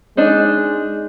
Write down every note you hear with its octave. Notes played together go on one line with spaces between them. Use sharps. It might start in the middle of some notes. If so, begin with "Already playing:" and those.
G#3 D4 D#4